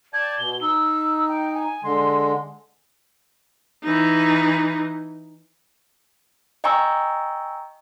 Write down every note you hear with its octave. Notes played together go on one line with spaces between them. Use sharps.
D5 G5 A5 G#6
B2 G7
D#4 E6
G5
G#5
D3 G#3 C6
E3 D#4
D#5 G5 G#5 A#5 C#6 E6